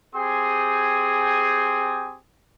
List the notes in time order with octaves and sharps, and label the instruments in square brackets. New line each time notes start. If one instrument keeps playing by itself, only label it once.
[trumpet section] C4 G4 G#4 G#5 C6 D#6